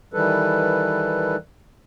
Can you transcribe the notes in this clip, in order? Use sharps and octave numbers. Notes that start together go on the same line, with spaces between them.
D#3 E3 G3 A4 B4